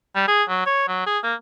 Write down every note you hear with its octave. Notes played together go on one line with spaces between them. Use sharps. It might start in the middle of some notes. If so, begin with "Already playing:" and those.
G3
G#4
F#3
C#5
F#3
G#4
A#3